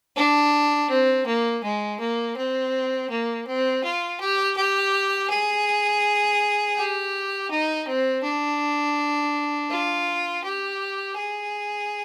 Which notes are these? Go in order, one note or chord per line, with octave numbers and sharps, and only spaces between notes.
D4
C4
A#3
G#3
A#3
C4
A#3
C4
F4
G4
G4
G#4
G4
D#4
C4
D4
F4
G4
G#4